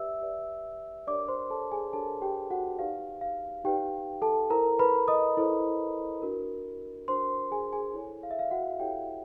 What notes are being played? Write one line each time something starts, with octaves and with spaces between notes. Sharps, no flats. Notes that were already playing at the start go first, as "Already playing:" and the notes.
Already playing: G4 B4 D5 E5 E6
G4 B4 D5
D4 G4 A#4 C#5 D5 D6
C5 C6
A4 A5
G#4 G#5
D4 G4 A4 A#4 C#5 A5
G#5
G4 G5
F#4 F#5
D#4 G4 B4 D5 F5
F5
D#4 G4 B4 D5 G5
A4 A5
E4 A4 A#4 C5 A#5
B4 B5
D#5 D#6
E4 A4 C5
D4 F#4 A#4
D4 F#4 A#4 C5 C6
G#4 G#5
G#4 G#5
E4 A4 C#5
F5
E5
F5
F#4 F#5
E4 G4 A4 C#5 G5
F5